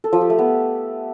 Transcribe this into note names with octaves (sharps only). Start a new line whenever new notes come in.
A4
F3
G4
A3
B3